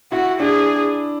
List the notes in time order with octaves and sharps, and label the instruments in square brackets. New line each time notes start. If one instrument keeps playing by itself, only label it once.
[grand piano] E4 [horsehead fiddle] F#4
[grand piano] D4 [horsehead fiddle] G#4